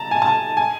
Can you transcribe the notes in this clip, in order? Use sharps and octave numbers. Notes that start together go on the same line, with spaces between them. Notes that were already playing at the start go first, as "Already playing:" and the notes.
Already playing: A5 A#5
G#5
A5
G#5